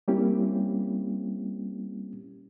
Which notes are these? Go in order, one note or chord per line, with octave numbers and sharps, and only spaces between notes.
G3 A#3 C4 C#4 E4 G4